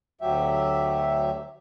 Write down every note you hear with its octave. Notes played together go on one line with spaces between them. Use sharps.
D2 F#3 G4 E5